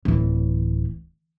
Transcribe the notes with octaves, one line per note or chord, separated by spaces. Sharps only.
D1 E3